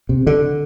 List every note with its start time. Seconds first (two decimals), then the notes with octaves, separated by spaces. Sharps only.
0.09 C3
0.27 D3